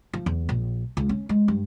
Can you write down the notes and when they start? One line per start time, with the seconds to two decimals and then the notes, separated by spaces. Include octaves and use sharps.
0.13 F3
0.26 E2
0.49 A#1
0.97 C#2
1.09 C#4
1.29 G#3
1.48 G2